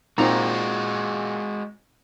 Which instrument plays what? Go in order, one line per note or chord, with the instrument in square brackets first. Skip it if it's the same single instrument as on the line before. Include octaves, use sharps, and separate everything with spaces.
[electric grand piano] A#2 [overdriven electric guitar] G#3 F#4 [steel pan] C4 D#4 A#5